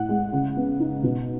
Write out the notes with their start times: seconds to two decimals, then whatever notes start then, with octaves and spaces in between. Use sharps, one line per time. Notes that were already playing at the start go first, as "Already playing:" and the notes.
Already playing: A2 F#5
0.09 G#3
0.33 C#3
0.56 B3
0.80 D#4
1.03 B2